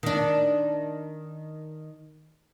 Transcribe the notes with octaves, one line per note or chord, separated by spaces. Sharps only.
D#3 D4